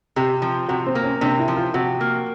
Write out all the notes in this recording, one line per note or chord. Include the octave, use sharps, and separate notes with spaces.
C3 G4
F3
C3 F#4
C4
A#3
C#4
C3 D4
E4
F3
F4
C3 F#4
A#3